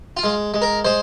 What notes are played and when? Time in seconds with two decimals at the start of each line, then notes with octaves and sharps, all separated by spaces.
0.17 F4
0.24 G#3
0.54 G#3
0.62 A#4
0.84 G#3 C5